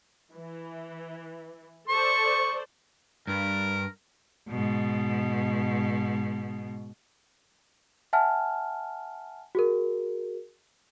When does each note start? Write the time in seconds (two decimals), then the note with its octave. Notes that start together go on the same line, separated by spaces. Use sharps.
0.33 E3
1.89 A4 C5 D5 C#6
3.27 G2 A#4
4.48 G#2 B2
8.13 E5 F#5 G#5 A5 F6
9.55 F#4 G#4 A#4